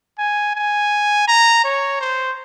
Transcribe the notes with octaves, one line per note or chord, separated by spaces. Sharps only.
G#5
G#5
A#5
C#5
C5